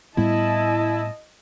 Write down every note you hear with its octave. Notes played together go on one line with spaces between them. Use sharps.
A2 G3 B3 E4 D#5 A5